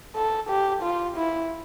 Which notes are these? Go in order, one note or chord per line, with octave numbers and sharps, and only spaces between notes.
A4
G4
F4
E4